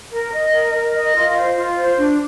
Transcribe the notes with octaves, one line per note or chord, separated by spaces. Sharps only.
A#4
D#5
A#4
A#4
D#5
F4
C5
F4
C5
D4